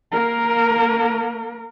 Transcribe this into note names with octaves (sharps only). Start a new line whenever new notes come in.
A#3 A#4